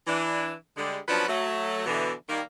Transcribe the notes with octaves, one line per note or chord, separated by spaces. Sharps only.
E3 D4
D3 G3 G#3
F3 F#3 B3 C#4 D4 B4
F#3 A3
B2 D3 E3
D#3 G3 A#3